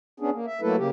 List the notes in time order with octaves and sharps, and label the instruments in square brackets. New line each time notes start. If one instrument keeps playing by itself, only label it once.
[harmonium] B3 C#4 D4 G#4
A#3
E5
F#3 A3 A#3 E4 A4 B4
C#3 A#3 G4